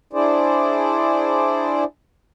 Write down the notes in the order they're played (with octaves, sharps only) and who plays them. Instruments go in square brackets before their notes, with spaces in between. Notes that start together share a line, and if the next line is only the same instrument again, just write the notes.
[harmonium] D4 E4 G#4 C5 D5